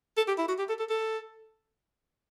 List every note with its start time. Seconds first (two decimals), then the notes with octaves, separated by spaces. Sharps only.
0.17 A4
0.28 G4
0.38 E4
0.48 F#4
0.59 G4
0.69 A4
0.79 A4
0.90 A4